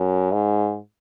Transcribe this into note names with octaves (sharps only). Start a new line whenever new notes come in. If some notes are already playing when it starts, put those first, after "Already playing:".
Already playing: F#2
G#2